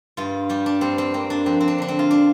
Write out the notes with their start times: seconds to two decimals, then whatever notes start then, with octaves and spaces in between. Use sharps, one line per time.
0.17 G2 F4
0.49 G3 G4
0.66 D4
0.81 G2 C4
0.98 C4
1.14 A#3 C4
1.30 D4
1.46 F2 C4
1.60 C4
1.68 D4
1.78 D3 D4
1.88 C4
1.99 F4
2.11 D4